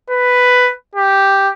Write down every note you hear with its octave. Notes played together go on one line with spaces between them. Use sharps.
B4
G4